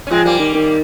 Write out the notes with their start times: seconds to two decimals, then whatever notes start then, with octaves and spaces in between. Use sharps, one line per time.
0.07 C#4
0.10 F3 G#3 C4
0.25 G3 A#3
0.40 D#3
0.55 D#3